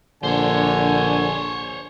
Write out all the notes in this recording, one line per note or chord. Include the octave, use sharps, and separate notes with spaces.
A#1 D3 C5 C#5 G#5